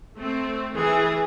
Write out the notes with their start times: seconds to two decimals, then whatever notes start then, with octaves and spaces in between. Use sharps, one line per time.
0.16 A3 C4
0.74 E3 G#4